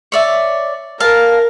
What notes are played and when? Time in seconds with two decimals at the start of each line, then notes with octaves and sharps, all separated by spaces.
0.12 C#5 D5 E5
1.00 A#4 F5 A5